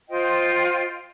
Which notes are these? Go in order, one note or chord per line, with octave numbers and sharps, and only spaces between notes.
F4 C5 D#5 G5